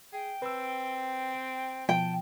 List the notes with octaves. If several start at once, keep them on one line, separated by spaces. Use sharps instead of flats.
G#4 G5
C4 B4 E6
B2 F3 G5 A5